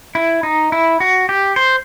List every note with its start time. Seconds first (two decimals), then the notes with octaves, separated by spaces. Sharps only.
0.15 E4
0.43 D#4
0.72 E4
1.00 F#4
1.29 G4
1.56 C5